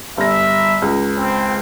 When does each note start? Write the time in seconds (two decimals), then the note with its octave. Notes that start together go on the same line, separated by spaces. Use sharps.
0.18 G1 E5 A#6
0.82 C#2
1.17 C4